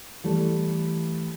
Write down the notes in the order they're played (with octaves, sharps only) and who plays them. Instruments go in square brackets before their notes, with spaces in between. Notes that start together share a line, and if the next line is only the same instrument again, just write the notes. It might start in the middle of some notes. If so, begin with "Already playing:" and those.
[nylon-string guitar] E3 G3 A3